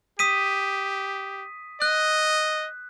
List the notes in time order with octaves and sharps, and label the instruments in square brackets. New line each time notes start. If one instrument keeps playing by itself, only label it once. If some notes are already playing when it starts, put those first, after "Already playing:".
[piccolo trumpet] G4 [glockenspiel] D#6 B6 D#7
[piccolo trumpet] D#5 [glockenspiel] F#6